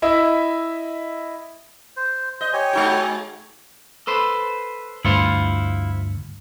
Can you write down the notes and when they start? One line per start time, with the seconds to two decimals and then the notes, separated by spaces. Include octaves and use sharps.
0.02 E4 D#5 E5
1.97 C5
2.41 C5 D#5
2.53 G4 C#5 G#5
2.73 G#3 D#4 F#4
4.07 A4 B4 C5
5.05 D2 G2 E4 F4 C5 C#7